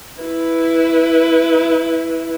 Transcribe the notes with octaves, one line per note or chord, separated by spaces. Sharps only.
E4 B4